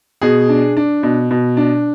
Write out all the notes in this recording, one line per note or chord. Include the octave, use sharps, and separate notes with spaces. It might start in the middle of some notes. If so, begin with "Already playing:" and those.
B2 G#4
D4
D4
B2
B2
D4